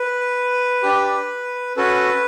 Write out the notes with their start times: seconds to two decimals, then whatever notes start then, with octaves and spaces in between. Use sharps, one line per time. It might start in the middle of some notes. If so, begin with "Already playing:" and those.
Already playing: B4
0.83 D4 G4
1.77 C#4 F#4 A4 B4